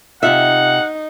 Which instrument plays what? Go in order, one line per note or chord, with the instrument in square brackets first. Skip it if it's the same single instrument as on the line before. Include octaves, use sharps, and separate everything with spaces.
[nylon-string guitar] C3 F4 E5 [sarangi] D#4 [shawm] F#5